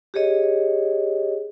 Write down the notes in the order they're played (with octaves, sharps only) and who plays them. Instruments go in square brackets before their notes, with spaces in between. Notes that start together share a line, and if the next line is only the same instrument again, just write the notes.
[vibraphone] G4 G#4 C#5 D#5